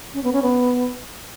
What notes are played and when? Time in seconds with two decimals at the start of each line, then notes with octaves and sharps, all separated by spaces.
0.14 C#4
0.23 B3
0.33 C#4
0.42 B3